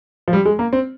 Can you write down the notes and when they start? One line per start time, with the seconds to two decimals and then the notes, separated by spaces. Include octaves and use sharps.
0.28 F3
0.33 G3
0.45 G#3
0.59 A#3
0.73 C4